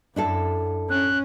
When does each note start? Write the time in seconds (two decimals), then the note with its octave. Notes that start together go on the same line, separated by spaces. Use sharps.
0.16 F#2 D4 E4 A4
0.90 C#4 F#6